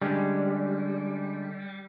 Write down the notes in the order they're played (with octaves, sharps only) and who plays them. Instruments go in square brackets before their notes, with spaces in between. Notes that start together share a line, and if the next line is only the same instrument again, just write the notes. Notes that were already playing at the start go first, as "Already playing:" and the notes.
[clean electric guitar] D3 G#3 C#4 [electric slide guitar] G3